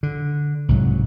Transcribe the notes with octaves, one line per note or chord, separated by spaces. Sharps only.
D3
C2 G#2 F#3